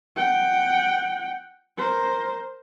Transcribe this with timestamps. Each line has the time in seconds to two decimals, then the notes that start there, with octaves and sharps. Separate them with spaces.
0.17 F#5 G5
1.78 A#4 C5